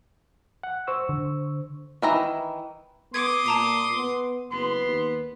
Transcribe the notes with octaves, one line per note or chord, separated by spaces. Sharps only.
F#5
C5 C#6 E6
D3
D#3 E3 A#5
B3 C6 D6 D#6 G#6
A#2 A5 A#5 C7
B3
F#1 B3 C6
D#2